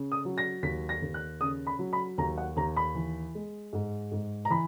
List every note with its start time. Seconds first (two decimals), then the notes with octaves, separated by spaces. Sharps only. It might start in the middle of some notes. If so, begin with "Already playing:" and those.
Already playing: C#3
0.12 D#6
0.25 F#3
0.38 A#6
0.63 D#2 B6
0.89 A#6
1.02 D#2
1.14 F#6
1.40 C#3 D#6
1.67 B5
1.79 F#3
1.93 B5
2.18 D#2 A#5
2.38 F#5
2.56 D#2 A#5
2.77 B5
2.95 E3
3.35 G#3
3.73 G#2
4.12 G#2
4.45 A#5
4.50 E3 B5